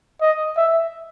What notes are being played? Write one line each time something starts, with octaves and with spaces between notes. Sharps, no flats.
D#5
E5